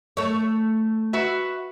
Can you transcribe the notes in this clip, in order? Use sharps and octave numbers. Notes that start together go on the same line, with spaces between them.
A3 C#5
F#4 B4 E5